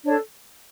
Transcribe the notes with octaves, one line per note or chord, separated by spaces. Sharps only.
D4 A4 C#5